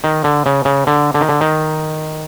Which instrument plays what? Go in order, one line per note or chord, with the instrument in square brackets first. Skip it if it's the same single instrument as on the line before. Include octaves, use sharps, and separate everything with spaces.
[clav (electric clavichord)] D#3
D3
C#3
C#3
D3
D3
D#3
D3
D#3